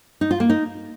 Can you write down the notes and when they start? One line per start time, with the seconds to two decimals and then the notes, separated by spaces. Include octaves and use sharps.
0.21 D#4
0.31 F4
0.40 A#3
0.49 D#4